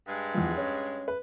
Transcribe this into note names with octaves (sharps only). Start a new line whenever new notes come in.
G2 G#3
E2 F3
C#4
B4